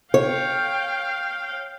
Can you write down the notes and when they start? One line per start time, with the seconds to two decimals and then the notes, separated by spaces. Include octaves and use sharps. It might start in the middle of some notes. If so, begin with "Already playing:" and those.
0.14 C#5 F5 G5